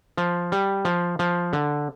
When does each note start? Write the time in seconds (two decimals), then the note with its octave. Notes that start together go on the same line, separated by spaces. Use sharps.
0.17 F3
0.52 G3
0.85 F3
1.19 F3
1.53 D3